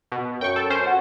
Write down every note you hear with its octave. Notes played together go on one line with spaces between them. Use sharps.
B2
F#2 G5 C#6
A4
C#4 C5
F#4